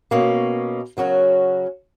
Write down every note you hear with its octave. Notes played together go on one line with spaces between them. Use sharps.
B2 A#3 C#4
C#3 F#3 C#4 F#4 A#4